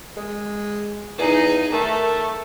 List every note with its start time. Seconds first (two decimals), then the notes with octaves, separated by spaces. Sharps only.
0.17 G#3
1.18 E2 D#4 G#4
1.72 D#3 A3